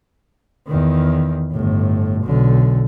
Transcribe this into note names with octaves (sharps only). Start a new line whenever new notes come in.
E2 D#3
G1 A2
B1 D3